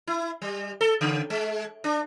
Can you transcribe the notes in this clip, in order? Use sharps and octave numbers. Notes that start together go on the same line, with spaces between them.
E4
G3
A4
C#3
G#3
D4